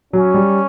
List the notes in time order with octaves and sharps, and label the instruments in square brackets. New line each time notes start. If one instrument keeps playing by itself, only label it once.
[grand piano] F#3 [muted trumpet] C#4
[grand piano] G3